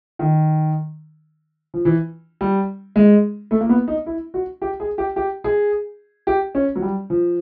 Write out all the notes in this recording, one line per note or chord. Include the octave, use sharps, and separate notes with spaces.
D#3
F3
E3
G3
G#3
A3
A#3
B3
D#4
E4
F#4
G4
G#4
G4
G4
G#4
G4
C#4
F#3
G3
F3